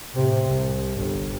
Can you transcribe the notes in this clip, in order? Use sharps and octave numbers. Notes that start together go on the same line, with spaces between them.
A2 C3
C2
G1 G2